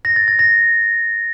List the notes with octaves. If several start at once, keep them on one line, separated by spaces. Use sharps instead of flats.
A#6
A6
A6
A#6